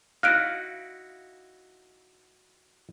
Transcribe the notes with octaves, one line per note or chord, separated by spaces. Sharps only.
D#4 E4 F#4 F5 F#5 F6 F#6 D7